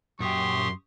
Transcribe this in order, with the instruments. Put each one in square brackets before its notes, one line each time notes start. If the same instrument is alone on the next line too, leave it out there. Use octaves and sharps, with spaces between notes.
[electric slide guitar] F#2 [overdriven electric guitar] A#2 G5 [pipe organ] G4 C#6 D#6 [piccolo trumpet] C6